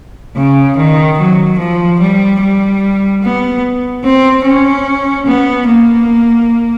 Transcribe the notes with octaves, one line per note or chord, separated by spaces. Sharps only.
C#3
D#3
F#3
F3
G3
G3
B3
C4
C#4
B3
A#3